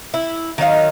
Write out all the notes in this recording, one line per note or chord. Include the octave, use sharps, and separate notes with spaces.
E4
D#3 F#3 D#4 F5